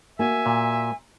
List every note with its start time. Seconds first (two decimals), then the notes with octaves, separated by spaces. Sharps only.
0.19 A#3 F#4 E5 G#5
0.46 A#2